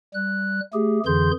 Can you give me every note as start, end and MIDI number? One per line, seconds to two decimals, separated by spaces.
0.14 0.60 55
0.14 0.60 90
0.73 1.00 57
0.73 1.00 67
0.73 1.00 68
1.06 1.31 41
1.06 1.31 50
1.06 1.31 52
1.06 1.31 68
1.06 1.31 84
1.06 1.31 91